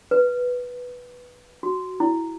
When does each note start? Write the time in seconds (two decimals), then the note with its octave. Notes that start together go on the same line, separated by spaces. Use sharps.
0.11 B4
1.63 F#4
2.00 E4